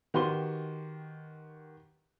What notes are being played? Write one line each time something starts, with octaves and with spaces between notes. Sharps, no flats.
D#3 F#4 G4 B4 C6 G7